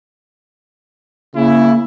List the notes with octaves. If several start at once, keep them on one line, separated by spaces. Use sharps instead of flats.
C#3 A#3 E4